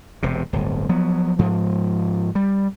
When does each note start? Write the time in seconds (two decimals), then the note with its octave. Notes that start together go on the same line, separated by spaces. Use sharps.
0.23 E1 C3
0.53 D1 G1
0.89 F3 F#3 B3
1.39 G#2 F3
2.35 G3